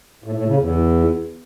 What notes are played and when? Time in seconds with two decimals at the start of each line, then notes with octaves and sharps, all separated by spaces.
0.24 A2
0.36 A2
0.48 C#3
0.59 E2